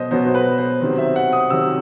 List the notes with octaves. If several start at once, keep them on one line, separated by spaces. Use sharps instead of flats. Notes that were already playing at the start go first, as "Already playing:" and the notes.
Already playing: B2 F#3 B3 C5 D#5
B2 F#3 B3 C5
C5
B4
C5
C3 D#3 F#3 C4
E5
F#5
D#6
C3 D#3 F#3 C4 E6